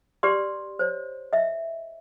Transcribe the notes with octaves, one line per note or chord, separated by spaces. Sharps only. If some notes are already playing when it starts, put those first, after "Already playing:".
G4 B4 D5 C6
C5 C#5
D#5 E5